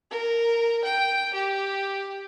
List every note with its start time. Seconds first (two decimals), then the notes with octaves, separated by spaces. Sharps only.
0.10 A#4
0.84 G5
1.34 G4